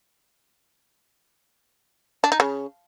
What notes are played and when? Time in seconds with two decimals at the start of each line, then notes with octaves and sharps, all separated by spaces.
2.24 D4
2.32 D#4
2.40 C#3